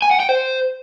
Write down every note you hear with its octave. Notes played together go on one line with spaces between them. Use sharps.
G#5
F#5
G5
C5